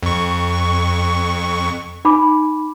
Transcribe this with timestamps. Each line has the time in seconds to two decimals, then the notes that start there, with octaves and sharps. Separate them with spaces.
0.03 F2 C#6
2.05 D#4 B5 D6